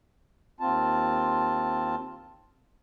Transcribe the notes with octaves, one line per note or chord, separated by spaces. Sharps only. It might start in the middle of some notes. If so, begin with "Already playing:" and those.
D#2 C4 F4 A5